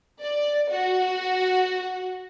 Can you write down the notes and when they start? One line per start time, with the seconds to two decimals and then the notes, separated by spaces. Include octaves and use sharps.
0.21 D5
0.70 F#4